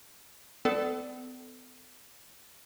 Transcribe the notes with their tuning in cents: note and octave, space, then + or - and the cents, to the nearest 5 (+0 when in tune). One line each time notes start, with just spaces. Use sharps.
B3 +45 A4 +0 D5 +10